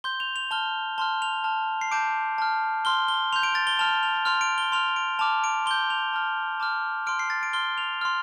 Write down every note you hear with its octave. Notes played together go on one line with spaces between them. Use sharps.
C6 G6 G7
F7
F7
A5 F6 G7
A5 C6 F6 G7
F7
A5 F6
C7
A5 D6 G6 D7
A5 F6
C6 F6 G7
G7
C6 G6 F7
D7
A6
G7
A5 F6 F7
F7
C6 F6 F7
D7
G7
C6 F6 F7
D7
A5 D6 F6 F7
D7
C6 G6 G7
F7
A5 F6
A5 D6 F6
C6 F6 D7
C7
A6
D7
C6 F6 G7
F7
C6 F6